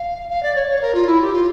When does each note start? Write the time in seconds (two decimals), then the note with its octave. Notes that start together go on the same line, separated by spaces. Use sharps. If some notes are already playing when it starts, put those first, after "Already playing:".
Already playing: F5
0.29 F5
0.42 D5
0.55 C#5
0.68 C#5
0.81 A#4
0.94 F4
1.06 E4
1.21 G4
1.32 F4